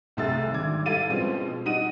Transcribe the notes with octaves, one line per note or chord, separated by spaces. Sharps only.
B1 C3 A3 G#4 E6 A6
G#1 D3 D6 G#6
G3 E4 A4 F5 A6 D#7
B2 F3 G#3 C4 C#4
G3 D#4 F#4 F#5 D#6 D#7